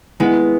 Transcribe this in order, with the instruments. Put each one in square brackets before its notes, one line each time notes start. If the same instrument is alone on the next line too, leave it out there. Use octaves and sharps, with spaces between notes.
[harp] G#3 B3 [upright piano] E4